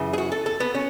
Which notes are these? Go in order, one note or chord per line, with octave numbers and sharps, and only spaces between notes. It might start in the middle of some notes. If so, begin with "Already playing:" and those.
Already playing: F#2 C#3 E3
G#4
F#4
A4
A4
B3
C#4